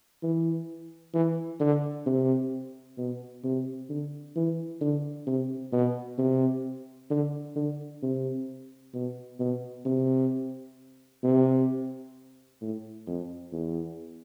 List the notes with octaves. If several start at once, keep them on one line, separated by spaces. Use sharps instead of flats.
E3
E3
D3
C3
B2
C3
D3
E3
D3
C3
B2
C3
D3
D3
C3
B2
B2
C3
C3
A2
F2
E2